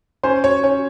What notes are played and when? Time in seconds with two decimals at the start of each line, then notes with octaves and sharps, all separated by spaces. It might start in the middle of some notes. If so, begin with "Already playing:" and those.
0.23 C#4 C5
0.44 C#5
0.63 C#4 C#5